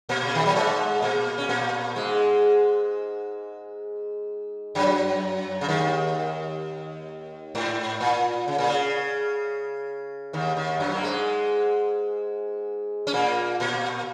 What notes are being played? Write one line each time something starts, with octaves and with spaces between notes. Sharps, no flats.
A#2 A#3
C#3
D#3
F#3
G#2 G#3
A#2 A#3
C#4
A#2 A#3
G#2 G#3
F#2 F#3
C#3
D#2 D#3
G#2
A#2
C#3
A#2
C#3
D#2 D#3
D#2 D#3
F#2 F#3
A#3
G#2 G#3
C#4
A#2 A#3
A#2 A#3